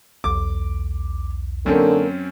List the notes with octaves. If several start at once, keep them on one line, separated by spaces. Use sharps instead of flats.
B1 E2 D6
F#2 D3 A#3 C4 C#4